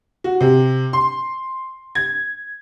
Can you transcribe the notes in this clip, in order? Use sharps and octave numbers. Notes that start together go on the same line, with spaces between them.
F#4
C3
C6
G#6